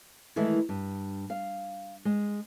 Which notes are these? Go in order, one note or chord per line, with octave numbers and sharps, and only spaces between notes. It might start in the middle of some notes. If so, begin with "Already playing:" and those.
D#3 E3 G#3 A3 E4
G2
F5
G#3